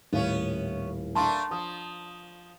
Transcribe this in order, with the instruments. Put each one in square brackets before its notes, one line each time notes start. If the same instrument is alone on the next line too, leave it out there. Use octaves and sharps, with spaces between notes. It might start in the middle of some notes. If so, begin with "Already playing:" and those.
[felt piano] D#1 A2 F5 [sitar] B3 C#4
[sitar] A3 A#3 D4 [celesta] A5 C6
[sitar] F3 [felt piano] D#6